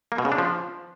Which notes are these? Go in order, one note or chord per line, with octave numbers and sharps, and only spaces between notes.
A#3
B2
C#3
D4
F3